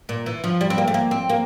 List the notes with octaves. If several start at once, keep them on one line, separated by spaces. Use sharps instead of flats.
A#2
E3
F3
G3
C4
A#3
A3
A#3
C4
A#3